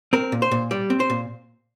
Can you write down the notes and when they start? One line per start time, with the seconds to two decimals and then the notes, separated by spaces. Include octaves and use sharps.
0.13 C4 A#4
0.32 A#2
0.42 C5
0.51 A#2
0.71 G3 D5
0.90 C4
1.00 C5
1.10 A#2